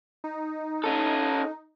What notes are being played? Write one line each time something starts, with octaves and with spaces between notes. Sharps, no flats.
D#4
C#4 A4